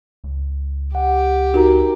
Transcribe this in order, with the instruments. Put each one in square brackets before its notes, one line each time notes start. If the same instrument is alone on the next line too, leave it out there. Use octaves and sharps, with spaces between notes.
[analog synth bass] C#2
[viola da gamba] G4 [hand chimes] F#5
[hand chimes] D#4 A#4 A#5 [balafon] F#4